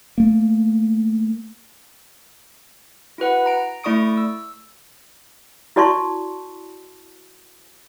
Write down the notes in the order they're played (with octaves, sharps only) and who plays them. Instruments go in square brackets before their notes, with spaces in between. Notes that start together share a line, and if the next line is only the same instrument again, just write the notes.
[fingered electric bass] A3 A#3
[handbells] E4 F#4 B4 F#5
A#5 D7
A3 E4 D5 C#6 D#6 D7
E6
[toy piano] E4 F#4 D5 A5 C6 C#6